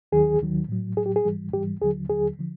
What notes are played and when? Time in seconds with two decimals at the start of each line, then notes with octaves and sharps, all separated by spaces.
0.12 D#2 D#3 F#3 G#4
0.41 D#2 D#3 F#3
0.69 A2 F#3
0.97 A2 F#3 G#4
1.06 G4
1.16 G#4
1.25 G#2 E3 G3
1.53 G#2 E3 G3 G4
1.81 D#2 D3 F#3 G#4
2.10 D#2 D3 F#3 G#4
2.39 D3 F3